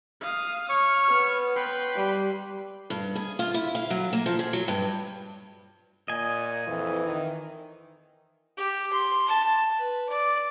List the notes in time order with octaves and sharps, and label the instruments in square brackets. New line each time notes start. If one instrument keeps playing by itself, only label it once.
[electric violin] F5 D#6
[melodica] C#5 C#6 [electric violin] F6
[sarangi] B3
[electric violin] B4 [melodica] G5 C6
[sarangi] G3
[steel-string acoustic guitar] G2
G#4
F4
E4
F5
F#3
A#3
F3
G#4
F#3
G2
[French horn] A#2 [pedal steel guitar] D#5 G#5
[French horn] F2 [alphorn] E3
[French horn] D#3
[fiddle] G4
C6
A5
B4
D5